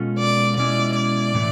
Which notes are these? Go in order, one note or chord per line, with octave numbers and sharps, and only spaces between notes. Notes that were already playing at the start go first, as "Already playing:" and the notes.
Already playing: B2 G#3 C#4 F4 A4
D5
B2 G#3 C#4 E4 D5
D5
A2 E3 A3